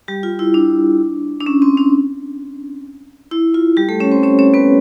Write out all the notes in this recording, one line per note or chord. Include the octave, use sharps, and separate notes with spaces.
G3 G4
F4
E4
D4
D4
C#4
C4
D4
E4
F4
G3 G4
A3 A4
C#4 C#5
C4 C5
C#4 C#5
C#4 C#5
B3 B4